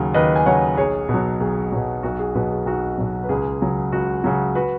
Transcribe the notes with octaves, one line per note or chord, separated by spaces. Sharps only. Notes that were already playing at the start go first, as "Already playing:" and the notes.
Already playing: D#2 C#3 F#3
D#2 B4 D#5
G#5
C#3 F#3 C#5 F#5
B1 G#4 C#5
B2
F#3
B1 G#4
B2 F#3
B1 F#4
G#4
B2 F#3 F#4 B4
G#4
B1 F#4
B2 F#3
B4
C#2 G#4
C#3 F#3
C#2 F#4
C#3 F#3 F#4
F#4 B4